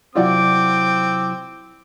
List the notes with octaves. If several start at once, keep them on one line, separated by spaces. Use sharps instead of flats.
C3 F#3 C4 E4 F4 D5 F#5 D6